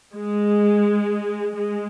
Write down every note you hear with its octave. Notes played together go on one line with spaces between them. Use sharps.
G#3
G#3